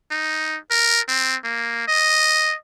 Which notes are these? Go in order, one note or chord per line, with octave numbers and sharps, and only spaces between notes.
D#4
A#4
C4
A#3
D#5